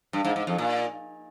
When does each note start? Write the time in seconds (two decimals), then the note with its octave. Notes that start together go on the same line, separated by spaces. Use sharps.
0.13 G2
0.25 G#2
0.36 G#2
0.47 F2
0.58 A#2